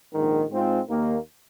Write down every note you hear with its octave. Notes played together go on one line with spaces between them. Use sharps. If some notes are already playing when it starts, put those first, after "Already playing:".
A#1 G#2 D#3
G#2 G#3 C4 F4
D#2 D#3 A#3